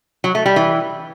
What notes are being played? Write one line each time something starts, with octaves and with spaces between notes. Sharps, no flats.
F#3
A3
G3
E3